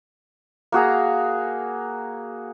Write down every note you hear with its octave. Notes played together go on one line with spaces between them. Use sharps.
A#3 F#4 G#4 A#5